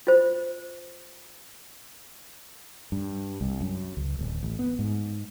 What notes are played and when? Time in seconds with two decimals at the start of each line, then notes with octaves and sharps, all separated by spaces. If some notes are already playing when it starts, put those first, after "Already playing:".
0.07 F4 C5
2.92 G2
3.41 C2
3.61 F#2
3.97 C#2
4.19 D1
4.43 A1
4.59 B3
4.79 G#2